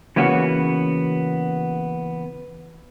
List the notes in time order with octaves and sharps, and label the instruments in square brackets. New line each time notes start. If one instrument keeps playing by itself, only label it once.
[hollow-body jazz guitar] C#3 E3 A#3 B3 C#4 F#4